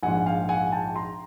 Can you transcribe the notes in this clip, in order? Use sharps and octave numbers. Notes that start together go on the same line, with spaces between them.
A#1 G#2 F3 F#5 G#5
F5 G5
F#5 G#5
G5 A5
A#5 C6